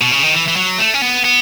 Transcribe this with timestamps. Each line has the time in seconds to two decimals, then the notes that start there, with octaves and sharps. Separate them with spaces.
0.01 B2
0.12 C#3
0.23 D#3
0.34 E3
0.48 E3
0.56 F#3
0.78 A3
0.94 C#4
1.02 B3
1.25 B3